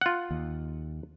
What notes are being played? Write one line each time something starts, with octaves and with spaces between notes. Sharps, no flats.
F4 F#5
D#2